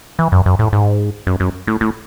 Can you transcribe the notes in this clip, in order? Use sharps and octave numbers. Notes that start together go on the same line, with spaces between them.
E3
F#2
F#2
A2
G#2
F#2
F#2
A2
A2